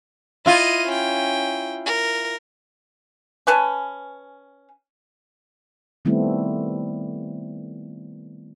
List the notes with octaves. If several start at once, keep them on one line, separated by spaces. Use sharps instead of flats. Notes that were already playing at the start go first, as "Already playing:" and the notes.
E4 F4 D#5 D#7
C#4 G5
A#4
C#4 B4 G#5 A5
D#3 G3 A3 B3 C4 E4